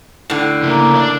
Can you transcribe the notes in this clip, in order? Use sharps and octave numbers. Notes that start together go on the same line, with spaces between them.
A2 D3
C#3 A#3 E4
D4 D5